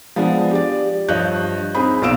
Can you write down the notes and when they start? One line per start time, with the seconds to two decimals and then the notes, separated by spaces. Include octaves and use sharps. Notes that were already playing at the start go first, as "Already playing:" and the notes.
0.16 F3 G#3 B3 D4
0.51 G4 D5
1.08 G2 F3 C#5 D#5 F#6 G6
1.75 C4 D#4 G#4 B5
2.02 B1 A#2 F5 E6 D7 E7